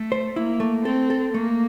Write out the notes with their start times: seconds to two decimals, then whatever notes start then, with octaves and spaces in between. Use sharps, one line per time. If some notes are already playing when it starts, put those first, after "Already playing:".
Already playing: A3
0.12 C5
0.36 A#3 E4
0.60 A3
0.85 C4 A4
1.10 A4
1.33 A3 A#3